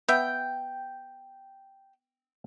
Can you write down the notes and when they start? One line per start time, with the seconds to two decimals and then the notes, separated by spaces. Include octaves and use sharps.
0.09 B3 E5 G5